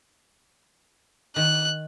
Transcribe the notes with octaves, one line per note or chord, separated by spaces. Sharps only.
D#3 F#6